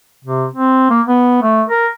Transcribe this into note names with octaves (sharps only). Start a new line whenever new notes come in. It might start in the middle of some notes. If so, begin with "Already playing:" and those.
C3
C4
A#3
B3
A3
A#4